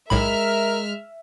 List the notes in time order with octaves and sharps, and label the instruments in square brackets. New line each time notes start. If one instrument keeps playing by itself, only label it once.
[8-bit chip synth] B1 A2 B5 [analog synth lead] G#3 [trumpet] A#4 [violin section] E5 F6